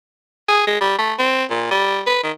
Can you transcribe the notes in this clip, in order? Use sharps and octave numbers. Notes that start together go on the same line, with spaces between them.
G#4
G#3
G3
A3
C4
A#2
G3
B4
D#3